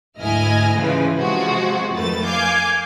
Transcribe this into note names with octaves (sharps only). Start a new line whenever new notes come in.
D2 G#2 E4 D#5 G#5 F6
C#3 E3 F3 G#3 B4
C3 F3 G#3 F#4
F2 D#3 A3 B4 A6
F5 G#5 D6 G6